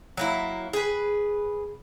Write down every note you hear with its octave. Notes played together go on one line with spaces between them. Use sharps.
F#3 A#3 E4
G#4 B4